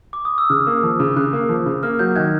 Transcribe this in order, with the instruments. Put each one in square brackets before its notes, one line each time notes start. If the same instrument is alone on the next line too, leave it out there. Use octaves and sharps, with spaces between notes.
[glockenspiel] D6
D#6
E6
[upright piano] C#3 [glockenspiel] F6
[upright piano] A#3
F3
C#3
[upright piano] C#3 [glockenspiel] F#6
[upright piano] A#3
F3
C#3
[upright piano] A#3 [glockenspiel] F6
[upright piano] F#3 [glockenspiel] G6
[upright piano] D#3 [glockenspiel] F#6 G#6